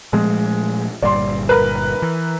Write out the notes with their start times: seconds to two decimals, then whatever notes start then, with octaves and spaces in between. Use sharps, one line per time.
0.13 A#2 F3 G#3 A3
1.02 G1 A#2 G3 D5 C6
1.49 A#4 B4
2.02 E3